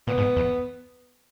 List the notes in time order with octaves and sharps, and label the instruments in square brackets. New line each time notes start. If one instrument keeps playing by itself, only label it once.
[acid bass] A#2 [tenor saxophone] B3
[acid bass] G#2
E2